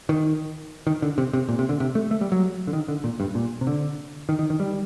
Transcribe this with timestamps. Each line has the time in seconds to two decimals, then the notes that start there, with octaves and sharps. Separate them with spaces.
0.09 D#3
0.87 D#3
1.02 D3
1.18 C3
1.33 C3
1.49 A#2
1.59 C3
1.69 D3
1.80 C3
1.95 A3
2.11 A3
2.21 G3
2.32 F#3
2.67 D3
2.73 D#3
2.88 D3
3.04 A#2
3.20 G2
3.35 A#2
3.61 C3
3.67 D3
4.29 D#3
4.39 D#3
4.50 D#3
4.60 G3